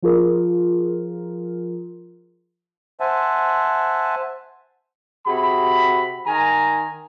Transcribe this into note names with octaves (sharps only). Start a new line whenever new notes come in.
F3 F4 G#4 A#4
C5 E5 F#5 G#5 A5
C3 F#4 G#4 B5
D#3 G#5 A#5